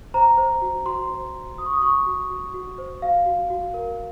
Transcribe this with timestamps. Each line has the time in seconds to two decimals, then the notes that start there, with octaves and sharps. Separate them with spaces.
0.14 C5 A#5
0.38 C5
0.62 F#4
0.86 F#4 C6
1.09 C5
1.34 F#4
1.58 F#4 D#6
1.66 C#6
1.73 D#6
1.82 F#4 C#6
2.06 F#4
2.30 F#4
2.54 F#4
2.78 C5
3.02 F#4 F5
3.26 F#4
3.50 F#4
3.74 A#4